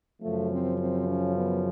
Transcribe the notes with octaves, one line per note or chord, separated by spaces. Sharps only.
F#2 C#3 F3 A3
C4
C4
C#4
B3